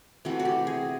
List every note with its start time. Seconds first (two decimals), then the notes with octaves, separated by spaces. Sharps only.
0.25 C3 E3 A3 F#4
0.39 F#4
0.45 G4
0.67 G#4